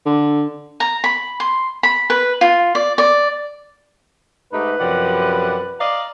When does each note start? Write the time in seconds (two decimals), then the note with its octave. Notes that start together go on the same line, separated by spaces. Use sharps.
0.06 D3
0.80 A#5
1.04 B5
1.40 C6
1.83 B5
2.10 B4
2.41 F4
2.75 D5
2.98 D5
4.53 G#2 A3 D#4 G4 B4
4.79 F#2 C3 F3 G4 D5 F#5
5.79 D5 D#5 F5 A#5